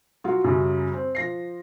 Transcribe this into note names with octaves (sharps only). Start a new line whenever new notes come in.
F#3 F4 F#4
F#2 C#3 F#3 G3
C4
F3 A#6 C7